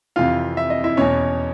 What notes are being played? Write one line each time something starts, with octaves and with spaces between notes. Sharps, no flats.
F2 C3 E3 F4 F5
E5
D#5
E4 E5
E2 B2 C#4 C#5